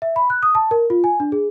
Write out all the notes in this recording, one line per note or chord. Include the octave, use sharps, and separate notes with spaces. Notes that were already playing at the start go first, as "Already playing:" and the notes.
E5
B5
F#6
D#6
A5
A#4
F4
G#5
D4
G#4